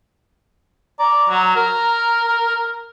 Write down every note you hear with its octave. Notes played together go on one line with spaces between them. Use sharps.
D5 A#5
F#3
A#4